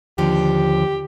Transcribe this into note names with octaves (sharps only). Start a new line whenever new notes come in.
D#2 D3 F3 G4